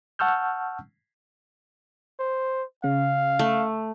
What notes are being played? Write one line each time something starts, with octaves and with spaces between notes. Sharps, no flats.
F#5 A5 C#6 E6 F6 G6
C5
C#3 F5
A3